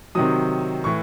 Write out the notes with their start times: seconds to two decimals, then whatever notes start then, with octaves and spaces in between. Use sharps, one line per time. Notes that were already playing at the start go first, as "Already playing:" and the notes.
0.15 C3 D#3 F#3 D#6
0.84 A2 E3 C#6